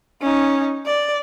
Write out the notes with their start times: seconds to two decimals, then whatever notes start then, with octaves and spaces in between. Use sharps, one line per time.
0.22 C#4 D#4
0.86 D5